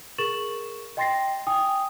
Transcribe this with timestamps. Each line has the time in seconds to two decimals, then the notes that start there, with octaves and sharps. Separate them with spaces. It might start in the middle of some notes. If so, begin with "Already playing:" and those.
0.18 G#4 A#4 C#6 A6 E7 F#7
0.97 D#5 G5 C6 A6 A#6 C7
1.47 G5 G#5 D#6